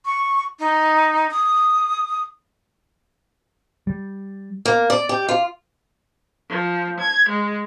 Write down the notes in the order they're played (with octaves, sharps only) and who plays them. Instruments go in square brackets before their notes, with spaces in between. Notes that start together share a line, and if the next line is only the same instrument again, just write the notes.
[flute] C#6
D#4
D#6
[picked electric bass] G3
[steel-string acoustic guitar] A#3
D5
G4
F4
[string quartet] F3
G#6
G#3